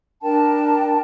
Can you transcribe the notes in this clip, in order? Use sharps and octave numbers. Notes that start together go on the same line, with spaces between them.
D4 A#4 G5 A5